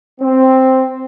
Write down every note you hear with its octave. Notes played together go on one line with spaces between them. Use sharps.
C4